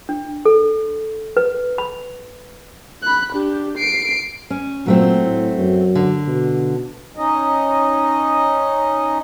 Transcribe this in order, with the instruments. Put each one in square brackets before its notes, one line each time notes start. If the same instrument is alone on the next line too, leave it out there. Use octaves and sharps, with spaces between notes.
[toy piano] D4
A4
B4
B5
[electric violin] B5 F#6
D4 G4
C7 D7
[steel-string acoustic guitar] C#4
[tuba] A#2 [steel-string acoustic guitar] F#3 A3 C4
[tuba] A2
F#2
[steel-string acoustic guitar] D3
[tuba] B2
[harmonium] C#4 D#4 D#5